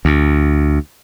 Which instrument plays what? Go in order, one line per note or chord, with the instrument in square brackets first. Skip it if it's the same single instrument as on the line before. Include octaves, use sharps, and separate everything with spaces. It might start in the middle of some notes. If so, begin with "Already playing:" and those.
[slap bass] D2